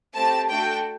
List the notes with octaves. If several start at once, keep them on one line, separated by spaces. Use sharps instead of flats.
A3 C4 G4 A5
A3 D4 F#4 A4 G5